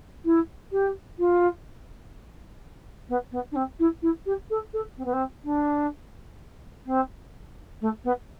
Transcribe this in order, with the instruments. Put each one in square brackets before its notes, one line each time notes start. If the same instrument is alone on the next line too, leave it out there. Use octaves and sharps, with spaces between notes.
[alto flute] E4
G4
F4
B3
B3
D4
C4
E4
E4
G4
A4
A4
C4
B3
C4
D4
C4
A3
B3